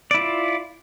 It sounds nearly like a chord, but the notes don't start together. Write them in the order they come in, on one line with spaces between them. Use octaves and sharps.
D5 E4 F4